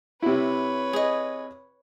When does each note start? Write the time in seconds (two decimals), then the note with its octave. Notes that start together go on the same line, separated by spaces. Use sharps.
0.22 C3 E4 B4 C#5
0.93 G#4 D#5